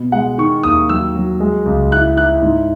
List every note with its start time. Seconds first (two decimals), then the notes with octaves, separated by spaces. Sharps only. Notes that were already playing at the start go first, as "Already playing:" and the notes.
Already playing: B2
0.12 G#3 F#5
0.38 D#3 C#6
0.63 D#2 D#6
0.89 F#3 E6
1.15 F#3
1.40 G#3
1.66 C#2
1.91 E4 F#6
2.17 E4 F#6
2.42 G#2